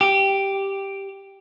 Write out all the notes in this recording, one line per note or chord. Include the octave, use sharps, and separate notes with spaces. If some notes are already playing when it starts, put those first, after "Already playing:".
G4